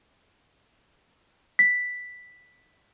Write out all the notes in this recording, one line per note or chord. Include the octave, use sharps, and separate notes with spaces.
B6